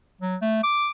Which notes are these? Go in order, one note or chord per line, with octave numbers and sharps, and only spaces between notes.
F#3
A3
D6